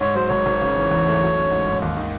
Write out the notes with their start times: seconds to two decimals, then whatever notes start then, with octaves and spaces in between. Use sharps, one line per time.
0.01 G#2 C#5
0.15 F#3 C5
0.28 G#1 C#5
0.46 G#1
0.61 C#3
0.76 E3
0.91 E2
1.07 A3
1.22 F#3
1.37 C#4
1.51 G#2
1.67 G#2
1.82 D#2
1.97 D#3